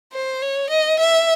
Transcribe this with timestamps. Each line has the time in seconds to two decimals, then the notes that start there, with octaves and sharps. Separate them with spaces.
0.13 C5
0.42 C#5
0.70 D#5
1.00 E5